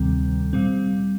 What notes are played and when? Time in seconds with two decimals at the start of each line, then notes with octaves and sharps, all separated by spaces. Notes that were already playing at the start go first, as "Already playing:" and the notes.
Already playing: D2 C3 D#3 G3 C4
0.53 A#2 G3 C4